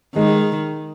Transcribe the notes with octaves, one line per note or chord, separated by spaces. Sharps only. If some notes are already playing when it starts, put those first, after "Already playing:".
D#3 G#3